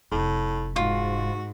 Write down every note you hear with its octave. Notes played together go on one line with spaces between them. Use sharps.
F1 A2
G#2 F4 F#4